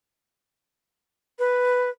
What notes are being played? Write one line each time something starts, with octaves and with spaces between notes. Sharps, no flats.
B4